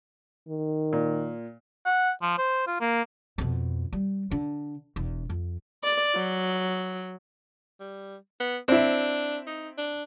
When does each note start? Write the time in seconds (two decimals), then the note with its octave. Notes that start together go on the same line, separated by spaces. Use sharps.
0.48 D#3
0.93 A#2
1.86 F#5
2.22 F3
2.38 C5
2.67 F4
2.81 A#3
3.38 F2 B2
3.93 G3
4.31 D3
4.96 E1 E2
5.30 F2
5.84 D5
6.15 F#3
7.80 G3
8.40 B3
8.68 C4 D4 E4
9.47 D#4
9.78 D4